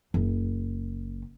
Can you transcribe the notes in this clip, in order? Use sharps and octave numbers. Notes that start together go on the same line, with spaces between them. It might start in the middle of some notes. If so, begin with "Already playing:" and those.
F#1